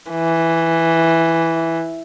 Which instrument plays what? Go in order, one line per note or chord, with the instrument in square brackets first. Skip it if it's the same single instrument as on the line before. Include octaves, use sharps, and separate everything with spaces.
[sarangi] E3